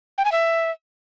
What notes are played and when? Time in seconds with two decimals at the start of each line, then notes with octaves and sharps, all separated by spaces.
0.18 G5
0.25 G#5
0.32 E5